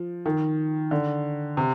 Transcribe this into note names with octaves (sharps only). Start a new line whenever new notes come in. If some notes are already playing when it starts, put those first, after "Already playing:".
Already playing: F3
D#3
D3
C3